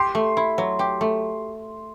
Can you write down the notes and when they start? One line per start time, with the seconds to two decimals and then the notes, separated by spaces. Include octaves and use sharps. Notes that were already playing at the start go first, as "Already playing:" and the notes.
Already playing: G4 C6
0.15 A3
0.37 E4
0.58 F#3
0.79 G4
1.01 A3